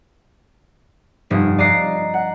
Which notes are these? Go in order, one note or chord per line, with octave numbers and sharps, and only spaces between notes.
F1 G2 D#6
D5 D#5 A#5 F#6 C7
F#5